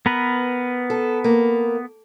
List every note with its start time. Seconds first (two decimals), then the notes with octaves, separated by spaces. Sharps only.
0.06 B3 A#4 B4
0.90 A4
1.24 A#3